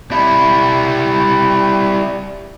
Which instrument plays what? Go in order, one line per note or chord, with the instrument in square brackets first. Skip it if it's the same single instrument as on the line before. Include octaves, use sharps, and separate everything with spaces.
[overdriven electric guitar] G3 E4